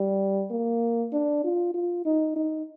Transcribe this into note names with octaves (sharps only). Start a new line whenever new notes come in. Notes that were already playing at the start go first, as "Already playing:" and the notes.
Already playing: G3
A#3
D4
F4
F4
D#4
D#4